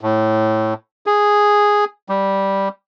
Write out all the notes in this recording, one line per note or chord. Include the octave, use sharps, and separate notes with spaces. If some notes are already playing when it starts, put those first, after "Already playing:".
A2
G#4
G3